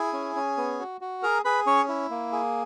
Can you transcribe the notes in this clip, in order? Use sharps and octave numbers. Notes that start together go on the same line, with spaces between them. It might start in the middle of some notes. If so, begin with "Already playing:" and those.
Already playing: E4 G#4 G#5
C#4
C#4
B3
F#4
F#4
G#4 A#4 A#5
G#4 B4 B5
C#4 C#5 C#6
E4
A#3
G#4